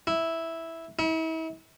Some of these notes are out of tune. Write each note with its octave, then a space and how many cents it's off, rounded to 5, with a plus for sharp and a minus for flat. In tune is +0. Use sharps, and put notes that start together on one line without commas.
E4 -5
E4 -40